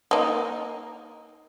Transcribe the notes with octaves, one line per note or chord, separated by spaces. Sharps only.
A#3 D#4